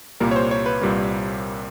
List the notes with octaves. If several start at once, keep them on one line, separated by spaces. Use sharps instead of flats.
C2 A#2 G3 A#3 A#4
C#5
C5
C#5
B4
C2 A#2 G3 A#3